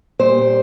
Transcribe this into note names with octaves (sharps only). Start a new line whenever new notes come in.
A#2 G3 C5